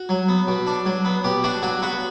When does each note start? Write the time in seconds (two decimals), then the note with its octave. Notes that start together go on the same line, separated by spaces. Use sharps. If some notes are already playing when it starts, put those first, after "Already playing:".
Already playing: F#4
0.09 F#3
0.28 B3
0.47 B2
0.67 D4
0.86 F#3
1.05 B3
1.24 B2 G4
1.44 D4 F#4
1.62 F#3 F#4
1.82 B3 F#4